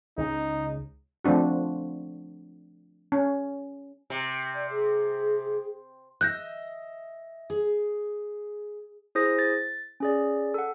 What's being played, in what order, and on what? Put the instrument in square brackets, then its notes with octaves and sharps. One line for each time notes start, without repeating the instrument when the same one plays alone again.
[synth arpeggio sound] C#2 C#3 [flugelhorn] D#4
[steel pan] F3 A3 C4 D4 F#4
C#4
[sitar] C3
[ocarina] D5
G#4
[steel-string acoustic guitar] D#5 E5 [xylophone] F#6 G6 A#6
[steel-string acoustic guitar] G#4
[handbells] E4 G#4 C5 D#6 A#6
A6
C#4 G#4 D5
A4 F#5